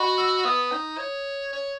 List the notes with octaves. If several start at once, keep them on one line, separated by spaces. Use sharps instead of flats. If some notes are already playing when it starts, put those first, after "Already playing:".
Already playing: F#4 D#5 B5 C#6
E6
B3 D#6
D#4
C#5
C#5